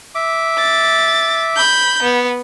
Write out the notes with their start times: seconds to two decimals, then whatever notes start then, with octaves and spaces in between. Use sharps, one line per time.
0.15 E5 D6
0.58 A6
1.56 B5 G6
2.02 B3